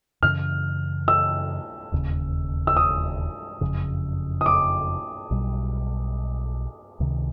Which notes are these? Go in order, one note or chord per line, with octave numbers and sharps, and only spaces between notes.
F#2 C#3 E3 F6
E6
E1 D#2 C#3
E6
D#6
F#1 F2 C#3
D#6
D6
B1 B2 G3
C#2 C3 D#3